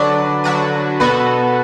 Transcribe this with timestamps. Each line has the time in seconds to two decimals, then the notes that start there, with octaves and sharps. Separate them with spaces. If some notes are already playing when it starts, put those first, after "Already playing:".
Already playing: D3 F#3 D4 F#4 B4 D5
0.44 D3 F#3 D4 F#4 B4
1.00 B2 B3 F#4 A4 B4